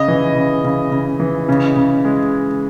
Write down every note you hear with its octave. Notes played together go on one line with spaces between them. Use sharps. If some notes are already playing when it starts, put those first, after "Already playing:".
Already playing: C#3 D#5
E3
C#3
C#3
C#3
E3
C#3
C#3
G#3